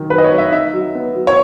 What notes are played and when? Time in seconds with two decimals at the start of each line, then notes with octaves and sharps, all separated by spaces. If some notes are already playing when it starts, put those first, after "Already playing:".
Already playing: F#2 D#3
0.10 F#2 B4
0.18 D#5
0.24 C#5
0.30 F#2
0.38 E5
0.52 D#4 E5
0.74 F#3
0.95 B3
1.15 F#3
1.27 C#5